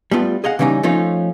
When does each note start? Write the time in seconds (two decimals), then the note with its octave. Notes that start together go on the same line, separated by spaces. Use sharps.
0.11 G3 A3 B3 F4
0.44 G#4 D#5 F5 F#5
0.59 C#3 E3 G3 C#4 D#4
0.83 F3 A3 C#4 D#4 F4